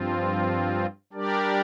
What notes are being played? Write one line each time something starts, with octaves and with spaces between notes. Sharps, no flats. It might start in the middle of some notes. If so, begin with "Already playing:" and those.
Already playing: G2 F3 C4 F4
G3 D4 G4 A#4 D5